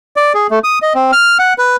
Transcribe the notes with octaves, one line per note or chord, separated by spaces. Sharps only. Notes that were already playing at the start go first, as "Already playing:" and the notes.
D5
G#4
A3
D#6
D#5
C4
F6
F#5
B4